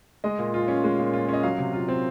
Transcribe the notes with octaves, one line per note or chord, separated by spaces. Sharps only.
G#3 D#5
A#2
F4
C#4
G#3
A#2
F4
C#4 D#5
F#3 F5
C3
F4
C4